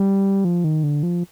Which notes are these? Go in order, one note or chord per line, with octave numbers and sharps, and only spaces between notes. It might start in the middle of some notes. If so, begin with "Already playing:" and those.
Already playing: G3
F3
D#3
D3
F3